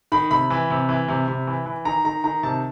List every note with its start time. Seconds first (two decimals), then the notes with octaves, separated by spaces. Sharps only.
0.12 D#3 B5
0.31 C3 B5
0.50 E3
0.70 C3
0.89 E3
1.08 C3
1.28 C3
1.47 E3
1.66 E3
1.85 D#3 A#5
2.05 D#3 A#5
2.24 D#3 A#5
2.43 C3 A5